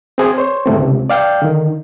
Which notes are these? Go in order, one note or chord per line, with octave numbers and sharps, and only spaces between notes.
C4 G#4 C5 G#5
C5 C#5
G#2 D3 A3 C4
C#2 C3
D5 F5 G5 G6
D3 D#3